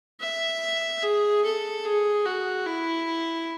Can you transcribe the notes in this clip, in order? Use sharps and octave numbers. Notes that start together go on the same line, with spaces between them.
E5
G#4
A4
G#4
F#4
E4